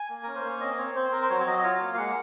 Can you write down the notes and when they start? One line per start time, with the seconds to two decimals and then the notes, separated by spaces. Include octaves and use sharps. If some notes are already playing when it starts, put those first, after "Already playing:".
Already playing: G#5
0.09 A#3
0.23 C#4 A#4
0.35 C5
0.44 A#3 C#5
0.61 C4 D#5
0.78 C4 C#5
0.95 C4 C5
1.12 C4 A#4
1.23 C5
1.30 F#3 C#5
1.40 C#5
1.47 F#3 D#5
1.59 D#5
1.63 F4 C#5
1.81 A#3
1.94 F5
1.97 G#3 F#5